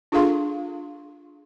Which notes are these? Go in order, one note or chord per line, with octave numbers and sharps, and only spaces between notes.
D4 F4 G#4 A4 F5 C6